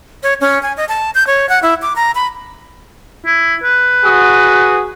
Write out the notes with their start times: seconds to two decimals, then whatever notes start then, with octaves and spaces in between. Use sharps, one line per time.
0.23 C#5
0.41 C#4
0.63 G#5
0.77 D#5
0.89 A5
1.15 G6
1.27 C#5
1.49 F#5
1.63 E4
1.82 D6
1.96 A#5
2.15 B5
3.26 E4
3.64 B4
4.03 F#4 G#4 D#6